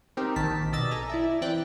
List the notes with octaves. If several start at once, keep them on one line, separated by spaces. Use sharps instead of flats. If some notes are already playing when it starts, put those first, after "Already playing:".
C4 D#4 G4 A#4
A#1 D#3 A5 B6
B2 D5 D#5 E6 A6
A4 G#5 A#5
E4 D5 E5
E3 C4 D5 G5 F#6 A6